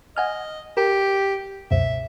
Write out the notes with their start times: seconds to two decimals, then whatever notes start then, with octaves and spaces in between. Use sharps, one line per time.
0.16 D#5 F#5 G#5 F6
0.77 G4 A#4
1.71 C#2 F#2 B2 E5